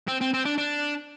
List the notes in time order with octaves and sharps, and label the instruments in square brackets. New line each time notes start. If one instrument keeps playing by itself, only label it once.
[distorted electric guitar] C4
C4
C4
D4
D4